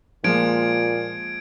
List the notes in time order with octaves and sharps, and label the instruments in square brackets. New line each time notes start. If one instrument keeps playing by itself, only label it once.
[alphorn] A#2 [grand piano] F3 G#3 A#3 [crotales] G#6 D7